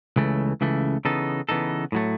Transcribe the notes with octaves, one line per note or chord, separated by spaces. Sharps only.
C#2 C#3 E3 A3
C#2 C#3 E3 A3
C#3 E3 B3 D#4 A4
C#3 E3 B3 D#4 A4
A2 F#3 A3